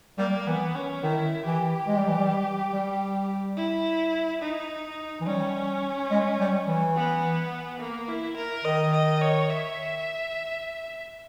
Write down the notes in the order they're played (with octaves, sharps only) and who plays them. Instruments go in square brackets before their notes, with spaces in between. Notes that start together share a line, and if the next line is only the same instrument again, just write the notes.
[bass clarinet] G3 [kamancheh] A#3
[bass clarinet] E3 [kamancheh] B3
[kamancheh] C#4
[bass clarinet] D#3 [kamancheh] E4
[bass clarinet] E3 [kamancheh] G4
[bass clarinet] G#3
G3
E3
G3
G3
[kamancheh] E4
D#4
[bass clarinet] E3
[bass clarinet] G3 [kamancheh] C#4
[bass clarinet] G#3
G3
E3
[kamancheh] B3
A#3
E4
A#4
[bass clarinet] D#3 [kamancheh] D#5
[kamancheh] D#5
C#5
E5